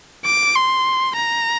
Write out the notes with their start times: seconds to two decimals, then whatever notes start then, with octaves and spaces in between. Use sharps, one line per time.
0.25 D6
0.56 C6
1.17 A#5